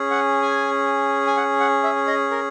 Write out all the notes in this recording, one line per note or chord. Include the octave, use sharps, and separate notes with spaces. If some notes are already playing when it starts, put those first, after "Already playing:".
Already playing: C#4 G#4
F#5
G#5
G#5
F#5
F#5
E5
D#5
A#4